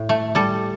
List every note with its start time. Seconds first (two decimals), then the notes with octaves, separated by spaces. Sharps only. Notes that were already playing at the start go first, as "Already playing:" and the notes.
Already playing: A2
0.09 A3
0.35 G3 A4